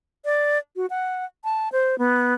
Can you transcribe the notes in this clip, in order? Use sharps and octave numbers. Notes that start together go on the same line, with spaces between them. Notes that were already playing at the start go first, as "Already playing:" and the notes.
D5
F#4
F#5
A5
C5
B3